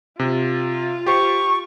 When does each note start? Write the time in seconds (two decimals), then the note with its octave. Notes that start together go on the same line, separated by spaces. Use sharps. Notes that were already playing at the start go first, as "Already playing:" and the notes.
0.19 C3 F4
1.06 G4 C5 C#6